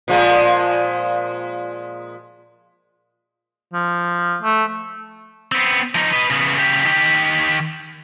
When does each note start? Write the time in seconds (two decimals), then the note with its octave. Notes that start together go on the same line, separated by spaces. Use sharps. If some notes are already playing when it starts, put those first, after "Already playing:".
0.08 A#2 F3 G#3
3.74 F3
4.43 A3
5.52 B3 C4
5.95 F3 D#4
6.13 B4 D#5
6.30 C#3 B3
6.58 C#3 G4
6.85 D#3 G4